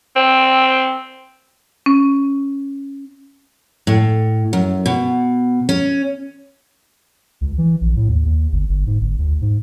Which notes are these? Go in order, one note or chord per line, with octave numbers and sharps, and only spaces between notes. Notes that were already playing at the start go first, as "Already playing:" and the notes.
C4
C#4
A2
F#2
B2
C#4
C#2
E3
A#1
A2
D#2
D#2
G1
G1
G#2
G1
D2
G#2